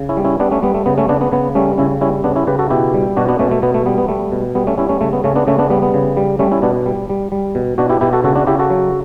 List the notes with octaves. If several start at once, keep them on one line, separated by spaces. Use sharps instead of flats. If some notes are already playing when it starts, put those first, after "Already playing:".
Already playing: C#3
C#4 E4
G3
C#4 E4
G3 B3 D4
A3 C#4
G3 B3
A3
C#3 B3
A3 C#4
C#3 B3 D4
B3
C#3 B3
G3 A3 C#4
C#3 C#4 E4
G3 C#4 E4
C#3 B3 D4
C#4 E4
C#3 G4 B4
F#4 A4
B2 E4 G4
G3
B2 D4 F#4
B3 D4
B2 A3 C#4
A3
B2 B3
A3
G3 B3
B3
G3 A3
B2
G3 B3
A3 C#4
G3 C#4 E4
A3 C#4
C#3 A3
B3
C#3 A3 C#4
B3 D4
C#3 A3 C#4
B3 D4
G3 B3
B3
C#3
G3
G3 A3 C#4
C#4 E4
B2 B3 D4
G3
G3
G3
B2
B2 D4 F#4
E4 G4
B2 E4 G4
F#4 A4
C#3 F#4 A4
D4 F#4
C#3 E4 G4
F#4 A4
F#3